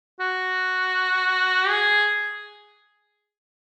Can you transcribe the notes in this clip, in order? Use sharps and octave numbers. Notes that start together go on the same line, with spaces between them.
F#4
G#4